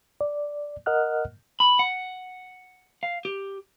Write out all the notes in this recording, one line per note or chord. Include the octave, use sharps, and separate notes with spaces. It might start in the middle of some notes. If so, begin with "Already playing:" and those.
D5
A#4 D#5 F#5 F6 F#6
B5
F#5
F5
G4